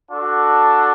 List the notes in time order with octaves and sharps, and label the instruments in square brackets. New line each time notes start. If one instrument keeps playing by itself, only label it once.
[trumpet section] D4 F#4 A4